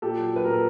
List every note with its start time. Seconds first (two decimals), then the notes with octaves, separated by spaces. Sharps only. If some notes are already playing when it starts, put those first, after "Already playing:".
0.02 A#2 G4 A4
0.17 F#3
0.32 F#3 B4
0.44 A#2 A#4
0.53 A4